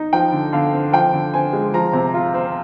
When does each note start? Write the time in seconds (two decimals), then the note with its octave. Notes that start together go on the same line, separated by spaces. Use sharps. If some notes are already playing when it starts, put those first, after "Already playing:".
Already playing: D#4
0.13 F3 G5
0.32 D3
0.53 D3 F5
0.73 C4
0.92 F3 G5
1.13 D3
1.33 C4 G#5
1.53 G#3
1.74 F3 A#5
1.93 C3
2.14 F4
2.34 C4